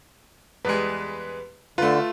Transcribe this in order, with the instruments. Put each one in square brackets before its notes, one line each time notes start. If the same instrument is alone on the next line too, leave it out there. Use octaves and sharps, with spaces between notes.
[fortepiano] E2 G3 G#3 [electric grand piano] B4
[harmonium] D3 [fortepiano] A3 B4 [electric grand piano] F4